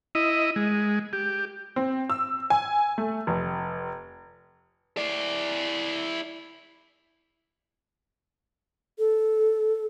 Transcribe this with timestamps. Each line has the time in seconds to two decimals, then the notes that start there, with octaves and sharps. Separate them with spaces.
0.15 E4 D#5
0.56 G#3
1.13 G4
1.76 C4
2.10 E6
2.50 G#5
2.98 A3
3.27 F1
4.97 E4 D5
8.99 A4